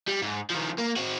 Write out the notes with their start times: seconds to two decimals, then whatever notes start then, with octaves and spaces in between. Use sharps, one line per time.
0.08 G3
0.22 G#2
0.50 D#3 F3
0.78 A#3
0.96 C4 F#4